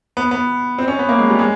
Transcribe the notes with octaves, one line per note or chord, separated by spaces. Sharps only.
B3
B3
C4
C#4
B3
A#3
G#3
G3
G#3